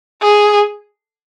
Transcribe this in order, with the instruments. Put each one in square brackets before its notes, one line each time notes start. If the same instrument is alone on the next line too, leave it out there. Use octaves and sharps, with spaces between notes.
[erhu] G#4